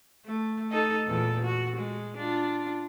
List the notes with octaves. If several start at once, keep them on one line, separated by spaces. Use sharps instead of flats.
A3
D#4 A4 D#5
E2 A#2 A4
F#4
G#3
D4 F4